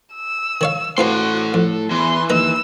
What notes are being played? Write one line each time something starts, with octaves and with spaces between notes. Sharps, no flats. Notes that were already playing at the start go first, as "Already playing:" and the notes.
E6
D#3 C#5 F5
A2 C4 F4 F#4 A4 B4 C6
F2
E2 E3 C6
D#2 D#4 B4 A#5 E6